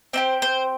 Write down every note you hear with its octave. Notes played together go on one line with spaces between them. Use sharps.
C4 D#4 G4 C5
C5